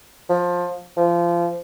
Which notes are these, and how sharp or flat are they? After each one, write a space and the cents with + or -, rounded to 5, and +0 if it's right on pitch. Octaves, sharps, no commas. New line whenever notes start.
F3 +20
F3 -25